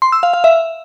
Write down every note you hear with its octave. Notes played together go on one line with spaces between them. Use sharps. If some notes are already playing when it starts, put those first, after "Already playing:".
C6
E6
F5
F5
E5